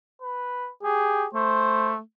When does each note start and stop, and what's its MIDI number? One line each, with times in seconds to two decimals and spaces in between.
0.22 0.70 71
0.83 1.27 67
0.83 1.25 68
1.34 2.00 57
1.34 1.93 72